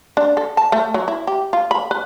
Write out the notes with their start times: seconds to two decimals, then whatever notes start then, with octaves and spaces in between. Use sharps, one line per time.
0.17 D4
0.37 A4
0.57 A5
0.72 A3
0.94 F#3
1.08 E4
1.27 G4
1.53 F4
1.71 B5
1.91 B4